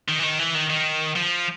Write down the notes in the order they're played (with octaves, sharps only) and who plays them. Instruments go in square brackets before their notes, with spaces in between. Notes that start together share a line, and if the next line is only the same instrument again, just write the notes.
[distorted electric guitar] D#3
E3
D#3
E3
D#3
D#3
F3